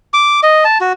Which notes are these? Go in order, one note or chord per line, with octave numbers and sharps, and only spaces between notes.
D6
D#5
A5
F#4